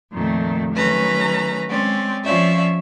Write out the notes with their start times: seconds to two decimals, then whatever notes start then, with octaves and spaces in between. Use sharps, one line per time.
0.12 F2 A#2 D#3 A3
0.73 D#3 F#3 A3 C#4 B4 A#5
1.69 G#3 C4 C#4 D5
2.24 F3 C#4 F4 C#5 D5 E5